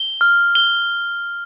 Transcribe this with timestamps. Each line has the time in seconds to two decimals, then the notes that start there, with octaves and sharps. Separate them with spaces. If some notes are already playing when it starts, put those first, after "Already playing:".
Already playing: G7
0.21 F6
0.55 G7